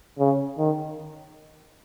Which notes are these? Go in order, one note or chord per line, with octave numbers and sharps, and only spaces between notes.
C#3
D#3